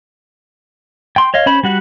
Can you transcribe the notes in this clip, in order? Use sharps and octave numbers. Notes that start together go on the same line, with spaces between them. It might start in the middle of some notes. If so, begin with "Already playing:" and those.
G5 C6
C#5 D#5 F5
C#4 C5 B5
G3 F#4 F#5